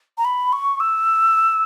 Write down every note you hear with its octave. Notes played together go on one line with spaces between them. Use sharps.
A#5
B5
C#6
E6